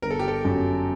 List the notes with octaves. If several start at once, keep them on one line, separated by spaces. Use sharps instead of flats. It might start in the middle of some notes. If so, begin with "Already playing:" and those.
G1 A#4
A4
G4
A4
F#2